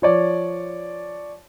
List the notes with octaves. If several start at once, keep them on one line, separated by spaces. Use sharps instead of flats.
F3 C#5 D5